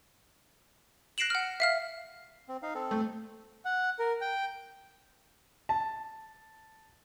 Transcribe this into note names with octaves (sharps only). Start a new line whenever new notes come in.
F#6 A#6 C7 D7 E7 F#7
F#5 F6
E5 F5 F6
C4
D#4 F5
C4 A4
A3
F#5
A#4
G5
A5